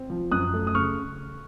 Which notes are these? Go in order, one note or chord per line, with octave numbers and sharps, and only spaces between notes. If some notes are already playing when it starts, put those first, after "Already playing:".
Already playing: C4
F3
F#2 D#6 F#6
A3
D#6
C#3 C#6 F6